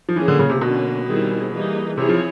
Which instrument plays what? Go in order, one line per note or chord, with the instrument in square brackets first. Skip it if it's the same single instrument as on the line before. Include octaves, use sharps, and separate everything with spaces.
[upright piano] F3
[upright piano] E3 [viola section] A#3 C#4 F4 G#4
[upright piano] D3
C#3
C3
[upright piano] B2 [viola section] D3 F#3 A#3 C#4
[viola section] D#3 G3 C4 E4 G#4
E3 G3 A#3 D#4 G#4
[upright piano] C3 [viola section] C4 E4 G#4 C#5
[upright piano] F3